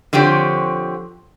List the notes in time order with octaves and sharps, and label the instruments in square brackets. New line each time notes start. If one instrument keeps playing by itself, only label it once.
[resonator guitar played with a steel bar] D3 F3 C4 G4 C#5